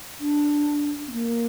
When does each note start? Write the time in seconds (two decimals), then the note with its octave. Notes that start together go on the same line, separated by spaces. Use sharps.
0.20 D4
1.08 C4
1.13 A#3